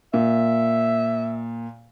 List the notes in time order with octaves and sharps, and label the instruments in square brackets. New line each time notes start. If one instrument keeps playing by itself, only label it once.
[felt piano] A#2 [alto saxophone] E5